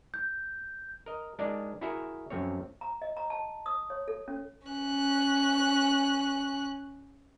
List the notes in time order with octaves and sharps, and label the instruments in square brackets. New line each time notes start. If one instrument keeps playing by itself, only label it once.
[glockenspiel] G6
[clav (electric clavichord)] A#4 D#5
G#3 D4 D#4 A#4 D5
E4 F#4 G#4 A#4 E5
F#2 F3 A3 C4 C#5
[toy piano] A#5
D#5
A#5
A5
D#6
C#5
A4
C#4
[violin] C#4 F#6